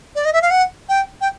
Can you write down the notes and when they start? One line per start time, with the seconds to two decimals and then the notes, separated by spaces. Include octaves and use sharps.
0.15 D5
0.25 D#5
0.33 E5
0.42 F5
0.50 F#5
0.89 G5
1.21 G5